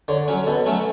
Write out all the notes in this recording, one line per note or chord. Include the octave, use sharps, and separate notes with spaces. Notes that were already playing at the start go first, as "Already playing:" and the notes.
D3 C#5
F#3 C#4
B2 A4
F#3 A3 C#4